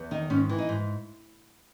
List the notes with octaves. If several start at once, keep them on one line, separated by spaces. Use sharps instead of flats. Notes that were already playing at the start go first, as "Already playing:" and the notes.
Already playing: E2
D#3 D#4
G#2 C#4
E3
D#4
G#2